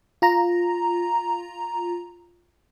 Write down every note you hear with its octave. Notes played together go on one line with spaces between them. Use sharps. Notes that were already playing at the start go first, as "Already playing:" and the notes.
F4 A#5